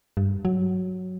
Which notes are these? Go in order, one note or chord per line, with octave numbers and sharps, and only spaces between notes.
G2
F#3